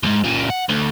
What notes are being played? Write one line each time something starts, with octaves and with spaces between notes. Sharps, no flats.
C#2 G#2
F#2 A#2
F#5
D2